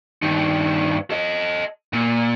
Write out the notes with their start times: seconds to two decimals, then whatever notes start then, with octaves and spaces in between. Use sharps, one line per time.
0.22 G2 D#3
1.11 A4 D#5
1.93 A#2